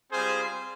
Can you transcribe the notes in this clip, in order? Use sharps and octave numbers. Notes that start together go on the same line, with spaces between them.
G3 C4 F4 G#4 C5